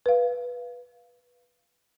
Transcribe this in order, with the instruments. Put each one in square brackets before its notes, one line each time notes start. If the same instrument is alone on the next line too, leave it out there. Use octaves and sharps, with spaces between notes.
[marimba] B4 F5